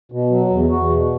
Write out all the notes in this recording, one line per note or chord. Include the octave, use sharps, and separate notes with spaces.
B2
F#3
E2
E2 F#4
B2